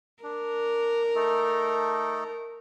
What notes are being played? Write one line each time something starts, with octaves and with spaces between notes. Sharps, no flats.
D4 A#4
A3 D#4 A4